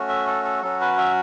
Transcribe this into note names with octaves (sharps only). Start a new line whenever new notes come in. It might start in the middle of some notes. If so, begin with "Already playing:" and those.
Already playing: A3 C#4 F#4
E5
A4
A4
F#3 C#4 F#4 A4
B4
E5